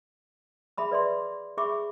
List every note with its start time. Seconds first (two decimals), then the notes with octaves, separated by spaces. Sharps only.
0.78 G#4 E5 B5 D#6
0.91 B4 D5 E5 C6
1.57 G#4 E5 B5 C#6 D6